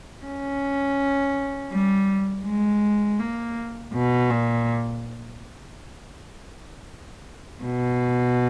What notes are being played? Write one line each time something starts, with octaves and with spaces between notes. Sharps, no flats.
C#4
G3
G#3
A#3
B2
A#2
B2